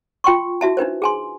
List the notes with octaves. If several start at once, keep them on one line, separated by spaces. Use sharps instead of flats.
F4 G5 C6 C#6
E4 F#4 E5 A5
D4 D#4 B4 C5
G#4 G#5 C6